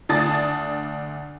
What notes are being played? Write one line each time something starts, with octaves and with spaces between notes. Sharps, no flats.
D2 D4 A5 D#6 A6